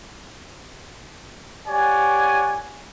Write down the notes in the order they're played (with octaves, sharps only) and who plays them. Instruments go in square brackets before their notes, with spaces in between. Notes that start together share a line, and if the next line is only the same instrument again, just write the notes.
[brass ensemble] G4 C#5 D5 F#5 G#5